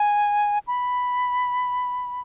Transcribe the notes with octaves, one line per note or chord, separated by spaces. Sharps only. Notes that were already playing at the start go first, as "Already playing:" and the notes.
Already playing: G#5
B5